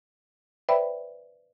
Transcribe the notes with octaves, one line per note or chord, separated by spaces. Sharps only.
B4 C5 D5 E5 G5 B5